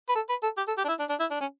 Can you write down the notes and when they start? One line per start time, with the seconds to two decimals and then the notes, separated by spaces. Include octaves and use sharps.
0.09 B4
0.15 A4
0.29 B4
0.43 A4
0.57 G4
0.67 A4
0.78 G4
0.84 D4
0.88 E4
0.99 D4
1.09 D4
1.20 E4
1.30 D4
1.40 C#4